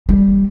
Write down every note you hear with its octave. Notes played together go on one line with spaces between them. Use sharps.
G3